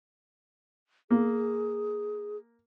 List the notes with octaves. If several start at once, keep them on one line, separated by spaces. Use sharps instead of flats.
A#3 G#4